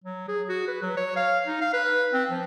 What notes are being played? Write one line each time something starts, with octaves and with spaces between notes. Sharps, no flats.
F#3
G#4
F#4
B4
F#3
C#5
F5
D#4
F5
B4
C4
F3